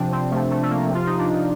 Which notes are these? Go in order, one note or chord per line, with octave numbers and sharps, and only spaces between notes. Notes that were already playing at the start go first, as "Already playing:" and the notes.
Already playing: C3 F3 C4 D4
C4
C3 F3 A3
A3
A3
A#3
C3 F3 F4
D#4
D4